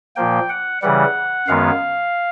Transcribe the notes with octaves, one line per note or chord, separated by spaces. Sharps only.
A#2 F3 A#3 G5
F#5
C#3 E3 G3 F#5
F#2 D#3 G#3 B3 F5